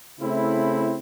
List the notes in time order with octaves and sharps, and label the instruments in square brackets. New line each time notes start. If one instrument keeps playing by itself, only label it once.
[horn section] C#3 A3 C4 E4